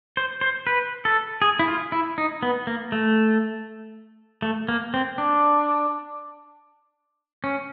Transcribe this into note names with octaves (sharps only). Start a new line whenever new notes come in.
C5
C5
B4
A4
G#4
E4
F4
E4
D#4
B3
A#3
A3
A3
A#3
C4
D4
C#4